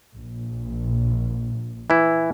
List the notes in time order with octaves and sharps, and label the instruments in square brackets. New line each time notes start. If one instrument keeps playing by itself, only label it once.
[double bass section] A#1
[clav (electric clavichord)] E3 E4